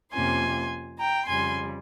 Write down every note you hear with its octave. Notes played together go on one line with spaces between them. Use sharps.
F2 C3 F3 A#3 C#4 G#5 C6
G5 A#5
F2 C#3 G3 G#5 C6